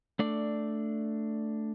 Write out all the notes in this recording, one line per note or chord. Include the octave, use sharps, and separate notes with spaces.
A3 D4 D5